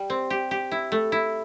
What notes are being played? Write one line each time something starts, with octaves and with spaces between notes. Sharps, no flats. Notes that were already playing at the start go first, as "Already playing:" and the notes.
Already playing: G3
C4
G4
G4
E4
A3
E4